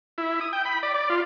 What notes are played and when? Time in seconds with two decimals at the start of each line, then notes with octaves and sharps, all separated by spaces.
0.18 E4
0.41 D#6
0.53 G5
0.65 B5
0.83 D5
0.94 D5
1.10 F4